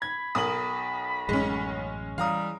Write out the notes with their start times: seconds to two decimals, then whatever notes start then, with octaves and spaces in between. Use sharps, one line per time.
0.02 B5 G#6
0.35 B1 A#4 D#6 F#7
1.29 A1 F#2 G#3 C#4
2.18 E3 G3 F5 A#5 D#6